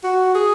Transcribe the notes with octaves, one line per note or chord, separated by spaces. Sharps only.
F#4
G#4